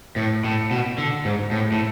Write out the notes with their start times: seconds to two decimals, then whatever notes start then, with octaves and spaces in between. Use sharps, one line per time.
0.16 A2
0.44 A2
0.71 B2
0.98 D3
1.25 G#2
1.51 A2
1.72 A2